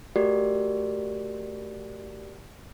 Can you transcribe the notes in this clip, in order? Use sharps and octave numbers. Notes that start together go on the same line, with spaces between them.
A3 F#4 G4 A#4 D5